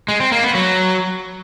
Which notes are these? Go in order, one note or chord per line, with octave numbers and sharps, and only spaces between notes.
G#3
C4
A#3
B3
F#3